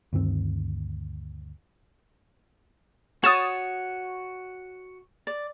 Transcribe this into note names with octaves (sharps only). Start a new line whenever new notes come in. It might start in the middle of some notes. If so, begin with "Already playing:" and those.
D2 G2 D#3 C4
F#4 C#5 D#6 A6 E7
D5